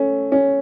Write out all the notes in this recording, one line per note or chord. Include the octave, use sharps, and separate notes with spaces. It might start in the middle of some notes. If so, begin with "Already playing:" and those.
Already playing: A3 C#4
C#4